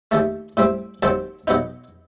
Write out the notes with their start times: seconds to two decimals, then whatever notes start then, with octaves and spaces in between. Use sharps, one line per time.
0.11 D#2 D#3 A3 A5
0.57 A2 G3 C4
1.02 D#2 D#3 F#3 C4 A5
1.47 B2 F#3 B3 D#4